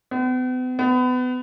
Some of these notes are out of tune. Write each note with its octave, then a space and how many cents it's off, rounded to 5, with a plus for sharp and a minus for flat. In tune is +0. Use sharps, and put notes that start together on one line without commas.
B3 +45
B3 +30